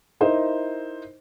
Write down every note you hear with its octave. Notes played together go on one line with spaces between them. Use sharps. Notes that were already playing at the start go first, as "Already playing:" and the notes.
D#4 E4 A#4 C5 D#5